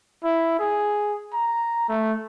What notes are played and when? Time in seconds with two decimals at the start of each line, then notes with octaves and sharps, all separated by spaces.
0.24 E4
0.59 G#4
1.33 A#5
1.89 A3